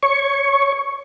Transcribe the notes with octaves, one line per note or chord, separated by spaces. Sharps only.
C#5 C#6